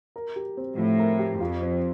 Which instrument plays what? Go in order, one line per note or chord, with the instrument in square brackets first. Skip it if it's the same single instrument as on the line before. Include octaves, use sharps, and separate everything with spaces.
[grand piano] A#4
G4
C4
[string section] A2 [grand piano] F3
[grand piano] A#4
G4
[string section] F2 [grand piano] F4
[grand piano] C4